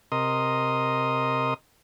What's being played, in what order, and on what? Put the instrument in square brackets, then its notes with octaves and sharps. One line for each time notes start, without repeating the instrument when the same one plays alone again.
[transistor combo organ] C3 A#4 D#5 C6 D#6